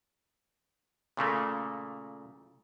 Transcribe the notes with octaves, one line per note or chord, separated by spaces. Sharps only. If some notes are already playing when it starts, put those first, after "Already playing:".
A#2 C#3 A3 A#3